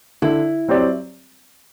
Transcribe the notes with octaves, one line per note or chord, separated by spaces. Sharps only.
D3 E4
F#3 C4 G4 D5